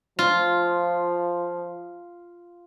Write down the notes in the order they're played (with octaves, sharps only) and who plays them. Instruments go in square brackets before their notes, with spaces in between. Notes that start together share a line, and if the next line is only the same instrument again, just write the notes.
[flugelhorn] F3 [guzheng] F4